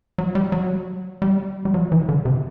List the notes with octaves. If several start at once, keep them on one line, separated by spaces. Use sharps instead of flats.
F#3
G3
F#3
G3
G3
F#3
E3
D3
C3